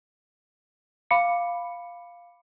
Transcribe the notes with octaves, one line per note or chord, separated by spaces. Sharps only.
F5 B5 D6 C#7